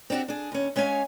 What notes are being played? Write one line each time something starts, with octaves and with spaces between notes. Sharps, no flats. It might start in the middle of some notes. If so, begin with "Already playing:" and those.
C4 D4 D#4 F#4 G4
D4 G#4
D#2 C#4
G#3 C#4 C#5 F5 G#5